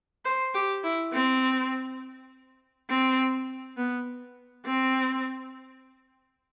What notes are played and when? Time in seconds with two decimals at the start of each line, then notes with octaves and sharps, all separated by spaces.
0.25 C5
0.54 G4
0.84 E4
1.13 C4
2.90 C4
3.77 B3
4.66 C4